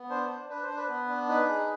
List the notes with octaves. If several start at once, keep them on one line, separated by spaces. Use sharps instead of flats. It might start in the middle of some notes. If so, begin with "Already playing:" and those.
Already playing: B3
D4 C5
D4
D4 B4
C5
D4
B4
B3
D4
D#4 B4
G#4